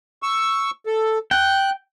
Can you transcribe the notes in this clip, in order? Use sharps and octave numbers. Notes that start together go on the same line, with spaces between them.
C#6 E6
A4
G5 F#6